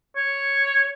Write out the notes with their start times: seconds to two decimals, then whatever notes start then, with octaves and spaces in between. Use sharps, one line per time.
0.16 C#5